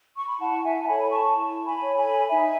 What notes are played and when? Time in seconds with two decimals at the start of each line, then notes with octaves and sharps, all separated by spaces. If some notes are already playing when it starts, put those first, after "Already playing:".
0.15 C#6
0.27 B5
0.40 E4 F#5 A5
0.64 E5 G#5
0.83 A5
0.87 A4 C#5 G#5 B5
1.11 A5 C#6
1.35 E4
1.66 G#5 B5
1.82 A4 C#5
1.97 G#5 B5
2.29 D#4 E5 G#5